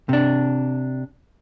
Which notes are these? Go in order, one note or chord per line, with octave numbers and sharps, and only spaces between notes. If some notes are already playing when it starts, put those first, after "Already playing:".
C3 D4